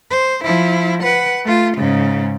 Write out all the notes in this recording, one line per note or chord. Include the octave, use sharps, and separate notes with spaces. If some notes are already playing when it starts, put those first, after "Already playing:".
C5
F3 E4
B4 F#5
A3 F4
G#2 C#3